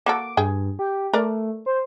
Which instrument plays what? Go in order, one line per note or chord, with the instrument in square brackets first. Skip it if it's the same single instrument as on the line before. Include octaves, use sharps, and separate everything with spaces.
[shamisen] A#3 F#4 A4 [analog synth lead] D6
[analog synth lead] G2 [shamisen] G#4 G5
[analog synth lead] G4
[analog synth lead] A3 [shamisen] A#4 D5
[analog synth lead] C5